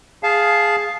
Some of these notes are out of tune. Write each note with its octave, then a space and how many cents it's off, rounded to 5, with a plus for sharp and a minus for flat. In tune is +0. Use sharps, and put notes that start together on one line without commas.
G#4 +0 F5 +0 A5 -20